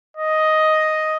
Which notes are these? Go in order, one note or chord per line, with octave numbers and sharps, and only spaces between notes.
D#5